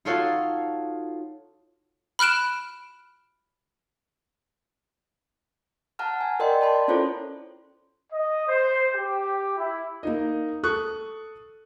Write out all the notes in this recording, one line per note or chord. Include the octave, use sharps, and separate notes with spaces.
D#4 F4 F#4 A4 C#5 F5
B5 F6 F#6 D7 E7
F#5 A5 A#5 F6
G#5
A#4 D5 D#5 G5 C6
D5 A5 B5 C6
C#4 E4 F4 A4 C5 C#5
D#5
C5
G4
E4
A#3 D#4 D#5
A4 C#6 D#6 F#6